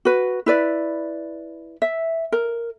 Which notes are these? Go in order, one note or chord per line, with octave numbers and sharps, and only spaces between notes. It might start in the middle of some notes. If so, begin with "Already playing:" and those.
F#4 B4
E4 B4 D5
E5
A#4